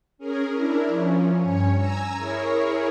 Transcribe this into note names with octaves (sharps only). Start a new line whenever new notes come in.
C#4 G#4 A#4
D4 E4 A#4
F3 C#4
G2 C#4 C#5
G#5 A#5 E6
E4 G#4 A#4 C#5